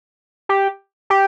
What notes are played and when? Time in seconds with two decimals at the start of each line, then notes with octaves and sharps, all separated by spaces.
0.49 G4
1.10 G4